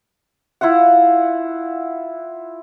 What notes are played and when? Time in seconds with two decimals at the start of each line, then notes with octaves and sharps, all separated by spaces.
0.61 E4 F4 F5 F#5